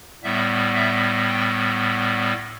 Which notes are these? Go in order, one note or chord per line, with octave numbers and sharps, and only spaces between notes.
A2 G3 B3 E5
E5
G5